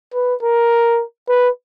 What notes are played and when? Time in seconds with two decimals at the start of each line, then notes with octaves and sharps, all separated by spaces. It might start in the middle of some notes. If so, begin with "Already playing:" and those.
0.14 B4
0.43 A#4
1.29 B4